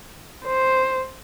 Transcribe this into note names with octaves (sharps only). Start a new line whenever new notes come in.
C5